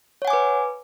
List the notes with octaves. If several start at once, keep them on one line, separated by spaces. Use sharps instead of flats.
B4 C#5 F#5 G#5 D6